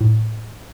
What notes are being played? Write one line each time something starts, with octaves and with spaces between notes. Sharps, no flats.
A2